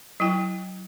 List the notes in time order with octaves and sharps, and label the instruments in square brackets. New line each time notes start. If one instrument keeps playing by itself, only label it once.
[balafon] F#3 E4 G5